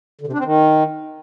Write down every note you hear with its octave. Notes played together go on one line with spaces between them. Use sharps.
D3
C3
D4
C4
D#3